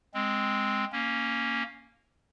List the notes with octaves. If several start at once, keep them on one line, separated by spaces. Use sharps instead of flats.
G#3 C4
A#3 C#4